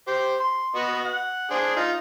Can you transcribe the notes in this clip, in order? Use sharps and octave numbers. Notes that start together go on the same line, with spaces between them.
G4 C5
C6
B3 F#4 D#5
F#5
D4 G#4 C5
D#4 F4